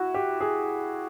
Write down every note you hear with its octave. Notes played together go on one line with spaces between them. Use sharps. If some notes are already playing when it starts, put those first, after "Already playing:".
Already playing: E4 F#4
G4
G#4